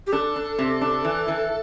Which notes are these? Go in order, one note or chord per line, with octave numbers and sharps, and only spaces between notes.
G4
D4 A4
D4
C3
D4
E3
E3